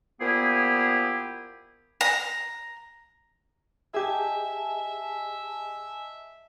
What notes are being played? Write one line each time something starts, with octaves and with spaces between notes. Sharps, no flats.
A#2 F3 B3 E4 G4 G#4
A#5
G4 G#4 D#5 E5 G#5 A5